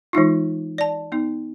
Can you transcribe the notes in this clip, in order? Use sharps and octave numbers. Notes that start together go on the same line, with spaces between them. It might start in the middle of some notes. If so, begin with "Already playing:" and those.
E3 G#3 D#4 F4
D5 A5
B3 D#4